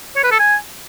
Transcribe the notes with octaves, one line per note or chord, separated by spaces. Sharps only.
C#5
B4
A4
G#5